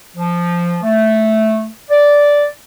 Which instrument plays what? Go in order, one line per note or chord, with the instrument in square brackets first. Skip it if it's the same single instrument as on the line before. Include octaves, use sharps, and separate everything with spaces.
[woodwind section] F3
A3
D5